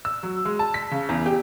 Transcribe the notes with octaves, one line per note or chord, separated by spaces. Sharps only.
E6
F#3
G#3
A5
B6
C#3
E2
G4